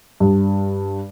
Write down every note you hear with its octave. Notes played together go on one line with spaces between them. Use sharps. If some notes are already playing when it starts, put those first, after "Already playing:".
G2